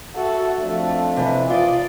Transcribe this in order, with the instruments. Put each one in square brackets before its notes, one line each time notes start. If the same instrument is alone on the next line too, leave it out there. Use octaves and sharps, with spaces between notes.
[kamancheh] F#4 A4 [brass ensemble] E5
[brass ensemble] F2 F3 D4 [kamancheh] A3
[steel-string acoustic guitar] C3 E3
[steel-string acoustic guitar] F4 D#5 [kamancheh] D5